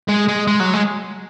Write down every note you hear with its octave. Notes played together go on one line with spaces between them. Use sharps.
G#3
G#3
G#3
F#3
G#3